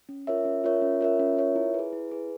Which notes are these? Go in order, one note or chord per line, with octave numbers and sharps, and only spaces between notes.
C#4
F4 A#4 C#5 E5
C#4
F4 A#4 C#5 E5
C#4
F4 A#4 C#5 E5
C#4
F4 A#4 C#5 E5
E4
G#4 B4
E4
G#4 B4